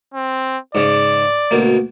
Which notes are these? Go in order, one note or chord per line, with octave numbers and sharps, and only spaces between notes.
C4
G#2 C#3 D5
D2 B2 A#3